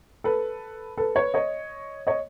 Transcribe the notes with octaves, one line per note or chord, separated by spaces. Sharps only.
A4 B4
A4 B4
B4 C#5
C#5 D#5
C#5 D#5